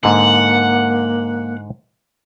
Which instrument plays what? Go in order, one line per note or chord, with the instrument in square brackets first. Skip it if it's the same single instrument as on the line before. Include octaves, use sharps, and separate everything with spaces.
[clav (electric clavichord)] G#2 D3 [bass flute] A#3 [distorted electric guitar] F#5